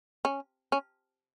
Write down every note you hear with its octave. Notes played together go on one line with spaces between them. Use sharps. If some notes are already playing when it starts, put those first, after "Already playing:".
C#4
C#4